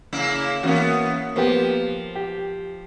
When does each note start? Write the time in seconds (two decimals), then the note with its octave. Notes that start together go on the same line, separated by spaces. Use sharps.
0.13 C#3 A#3 E4
0.63 E3 A#3 B3 C#4 F#4
1.36 F3 A#3 B3 G4
2.15 G4